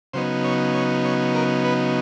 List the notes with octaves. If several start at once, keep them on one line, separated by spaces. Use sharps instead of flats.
C#3 F#3 B3 D#4 C5
C#5
C#5
C#5
A#4
B4